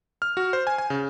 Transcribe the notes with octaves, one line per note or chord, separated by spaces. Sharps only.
F6
F#4
C5
G#5
G#5
C#3